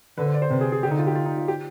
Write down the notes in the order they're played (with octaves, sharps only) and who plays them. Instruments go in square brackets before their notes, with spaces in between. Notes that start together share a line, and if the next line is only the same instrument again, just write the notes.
[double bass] D3 [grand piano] B4
[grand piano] C5
D5
C5
[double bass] C3 [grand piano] B4
[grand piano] G#4
G#4
[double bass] D3 [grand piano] G4
[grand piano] D#4
F4
G4
F4
D#4
F4
G4